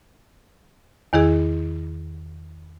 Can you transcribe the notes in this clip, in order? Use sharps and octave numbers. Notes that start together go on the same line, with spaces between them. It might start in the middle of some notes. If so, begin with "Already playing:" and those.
E2 D#3 E4 G#4